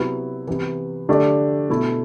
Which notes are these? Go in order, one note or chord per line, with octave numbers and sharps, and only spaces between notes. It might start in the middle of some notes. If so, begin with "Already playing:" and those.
Already playing: C3 F#3 B3 E4
C3 E3 B3
D3 A3 D4 G4
B2 A3 E4